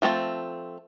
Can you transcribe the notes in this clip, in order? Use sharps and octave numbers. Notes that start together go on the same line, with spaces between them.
F3 A3 C4 A5